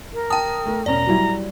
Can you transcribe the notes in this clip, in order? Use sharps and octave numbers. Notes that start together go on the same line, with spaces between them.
A#4
G5 A5 D#6
A3
E1 C#4 D5 A#5
F#3 G3 E4